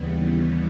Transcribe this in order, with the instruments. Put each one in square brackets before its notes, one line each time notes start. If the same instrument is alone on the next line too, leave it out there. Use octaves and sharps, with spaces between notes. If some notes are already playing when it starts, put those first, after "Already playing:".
Already playing: [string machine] D#2 C#3 E3 G3 B3